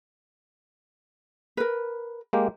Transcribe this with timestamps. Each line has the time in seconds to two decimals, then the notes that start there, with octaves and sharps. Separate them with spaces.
1.57 A#4 B4
2.33 G#3 A#3 G4